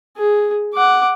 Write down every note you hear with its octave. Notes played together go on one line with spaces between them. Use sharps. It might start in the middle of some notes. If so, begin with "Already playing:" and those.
G#4
F#5 D6